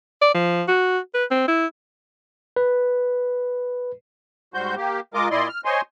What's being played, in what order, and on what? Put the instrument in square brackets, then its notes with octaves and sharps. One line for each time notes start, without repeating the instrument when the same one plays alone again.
[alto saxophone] D5
F3
F#4
B4
C4
E4
[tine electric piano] B4
[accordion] G#2 G3 F#4 C5 G6
A#3 G4
G#3 F4 A#4 D#5 D6
A#2 E4 D5 D#5 C6
F6
C5 C#5 D#5 G#5 C6